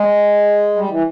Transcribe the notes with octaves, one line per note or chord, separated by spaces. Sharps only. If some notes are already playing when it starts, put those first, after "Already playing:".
Already playing: G#3
G3
E3